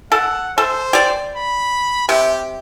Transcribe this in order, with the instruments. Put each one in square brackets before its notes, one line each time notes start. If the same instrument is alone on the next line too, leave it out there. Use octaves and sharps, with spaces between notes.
[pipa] A4 [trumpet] F#5
[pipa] A4 [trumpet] C5
[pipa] G4 D5
[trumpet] B5
[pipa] C3 [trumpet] G4